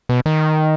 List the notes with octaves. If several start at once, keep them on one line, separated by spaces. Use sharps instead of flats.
B2
D#3